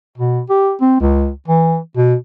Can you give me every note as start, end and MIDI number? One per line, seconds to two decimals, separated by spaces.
0.18 0.41 47
0.50 0.73 67
0.81 0.99 60
1.00 1.30 37
1.48 1.78 52
1.97 2.15 47